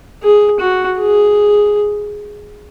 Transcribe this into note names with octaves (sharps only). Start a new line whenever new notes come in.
G#4
F#4
G#4